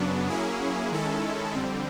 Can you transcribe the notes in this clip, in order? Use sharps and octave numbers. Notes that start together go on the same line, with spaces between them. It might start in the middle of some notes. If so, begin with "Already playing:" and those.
Already playing: F#2 C#3 F#3 B3 D4
F#3 A#3 C#4 E4 G#4
D#3 G#3 C#4 E4 A4
F2 D3 G3 C4